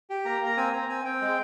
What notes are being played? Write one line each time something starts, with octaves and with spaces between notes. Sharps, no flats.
G4
A#3 A#5
A#3 A#5
C4 G#5
C4 A#5
C4 G#5
C4 G5
G#3